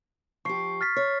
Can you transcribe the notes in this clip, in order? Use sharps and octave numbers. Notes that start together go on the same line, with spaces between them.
F3 G4 C#6 C7
F6 A6 B6
C#5